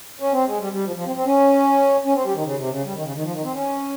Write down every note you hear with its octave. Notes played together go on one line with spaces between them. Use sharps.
C#4
C4
G#3
G3
G3
F3
F3
C4
C4
C#4
C#4
C4
G3
D#3
C#3
C3
C#3
G3
D#3
C#3
D#3
F3
D#3
C4
C#4